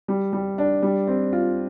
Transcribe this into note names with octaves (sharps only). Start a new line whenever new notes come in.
G3
G3
D4
G3
C4
F4